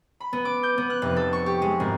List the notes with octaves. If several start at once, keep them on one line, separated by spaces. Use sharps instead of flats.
B5
B3
D6
G6
B3
F#6
F1
A4
C#6
G4
G#3
G#1